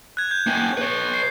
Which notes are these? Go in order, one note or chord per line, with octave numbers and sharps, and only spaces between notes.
F#6 G#6
G6
A#3 C#4
B4 C#5
C7